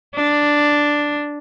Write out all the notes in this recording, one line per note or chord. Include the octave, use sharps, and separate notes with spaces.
D4